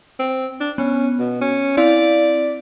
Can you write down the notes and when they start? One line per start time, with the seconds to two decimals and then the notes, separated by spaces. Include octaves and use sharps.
0.19 C4
0.60 D4
0.78 B3 C#4
1.19 B2
1.41 C#4
1.77 C4 E4 D5 F5